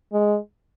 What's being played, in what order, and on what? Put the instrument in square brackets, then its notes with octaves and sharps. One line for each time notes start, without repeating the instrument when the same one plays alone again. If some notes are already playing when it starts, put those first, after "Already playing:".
[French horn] G#3